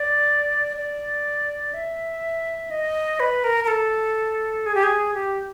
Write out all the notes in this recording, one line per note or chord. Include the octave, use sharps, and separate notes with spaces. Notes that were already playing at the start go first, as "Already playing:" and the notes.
Already playing: D5
D5
E5
D#5
B4
A#4
A#4
A4
G#4
G4
G#4
G4